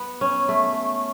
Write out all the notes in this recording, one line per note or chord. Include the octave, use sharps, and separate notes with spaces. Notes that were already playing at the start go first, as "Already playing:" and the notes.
Already playing: B3
C#4
A3